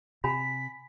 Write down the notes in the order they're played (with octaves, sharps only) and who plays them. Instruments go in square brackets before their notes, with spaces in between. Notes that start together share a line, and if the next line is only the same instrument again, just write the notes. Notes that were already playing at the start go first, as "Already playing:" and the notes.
[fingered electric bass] C3 [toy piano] G#5 A#5 B5 [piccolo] B6